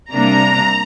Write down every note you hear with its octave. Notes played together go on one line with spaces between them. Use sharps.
C3 G3 A#3 D4 A#5